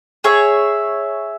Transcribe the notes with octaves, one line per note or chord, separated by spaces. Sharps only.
G#4 C#5 E5